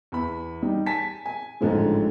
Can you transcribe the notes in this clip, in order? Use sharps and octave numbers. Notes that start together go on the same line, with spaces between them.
E2 B5
G3 D#4
G#5 A5 B6
G#5
A1 G#2 D3 F3 G#3